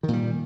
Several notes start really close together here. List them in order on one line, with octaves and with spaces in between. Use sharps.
D#3 A#2 G3